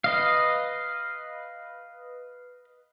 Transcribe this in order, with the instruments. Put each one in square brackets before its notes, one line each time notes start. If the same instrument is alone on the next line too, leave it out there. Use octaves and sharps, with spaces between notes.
[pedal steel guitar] B4 D#5 F5